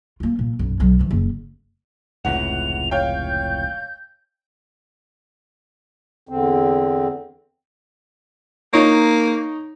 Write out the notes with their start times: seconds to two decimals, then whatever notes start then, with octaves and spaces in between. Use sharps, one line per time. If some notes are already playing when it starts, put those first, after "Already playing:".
0.20 A#3 F4
0.39 A#2
0.59 B1 F#2
0.80 B1 F#3
0.99 D#3 F3
1.11 F#1
2.25 F1 C#2 A2 F#5 F7
2.91 C#5 F5 G5 G6
6.29 E2 D3 C4
8.73 A#3 D#4 C#5